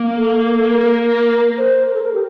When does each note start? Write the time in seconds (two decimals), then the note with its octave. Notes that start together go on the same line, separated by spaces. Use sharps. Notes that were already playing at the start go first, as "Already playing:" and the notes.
Already playing: A#3
0.17 A4
0.45 A#4
0.56 A4
0.69 A#4
1.57 C5
1.86 A#4
1.94 A4
2.02 A#4
2.14 G4